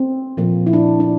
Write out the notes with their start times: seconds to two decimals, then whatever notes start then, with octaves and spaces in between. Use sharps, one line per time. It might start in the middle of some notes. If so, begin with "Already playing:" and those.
Already playing: C4
0.37 A#2 F3 A#3
0.67 E4
0.73 D4
1.00 D4